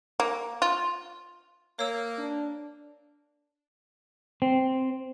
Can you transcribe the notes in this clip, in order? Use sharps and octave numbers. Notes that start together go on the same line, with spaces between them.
A#3
F4
A#3 C#5 E6
D4
C4